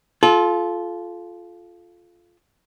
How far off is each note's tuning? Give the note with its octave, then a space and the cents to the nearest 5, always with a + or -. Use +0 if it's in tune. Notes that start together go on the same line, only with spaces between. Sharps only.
F4 +0 A4 -30